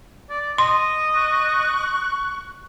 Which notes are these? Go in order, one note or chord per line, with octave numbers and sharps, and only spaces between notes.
D5
D#5 C6
C#6 F#6